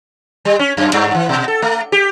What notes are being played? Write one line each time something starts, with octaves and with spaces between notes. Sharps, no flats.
G3
C#4
F#2
G2
E3
B2
A4
A3
G4